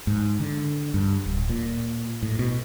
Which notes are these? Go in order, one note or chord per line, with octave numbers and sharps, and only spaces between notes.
G#2
D3
G2
D1
A#2
A2
B2